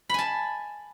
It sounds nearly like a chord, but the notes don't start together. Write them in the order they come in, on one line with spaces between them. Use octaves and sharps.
B5 G#5 A5